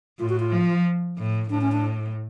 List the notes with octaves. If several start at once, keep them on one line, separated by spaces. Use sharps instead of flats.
A2 F4
F#4
F4
F3
A2
A2 D4
C#4
D4